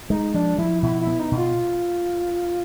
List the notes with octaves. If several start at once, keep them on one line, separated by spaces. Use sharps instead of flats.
G#3 D#4
F3 D4
F3 E4
B2 E4
E4
B3
D#4
B2
F4